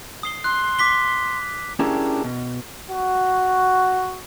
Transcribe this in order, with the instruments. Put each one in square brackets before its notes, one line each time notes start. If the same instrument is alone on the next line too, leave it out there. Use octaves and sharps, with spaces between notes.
[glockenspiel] D#6 C7 G7
[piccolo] C6 [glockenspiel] F#6
[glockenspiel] D6 B6 G7
[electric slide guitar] C#4 D4 E4 G4 G#4 A#4
B2
[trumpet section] F#4